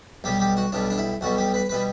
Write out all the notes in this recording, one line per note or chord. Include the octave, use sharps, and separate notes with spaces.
B1 B2 G3 G4
G4
F#4
B1 B2 G3 D4
D4
E4
B1 B2 G3 F#4
G4
B4
B2 G3 B4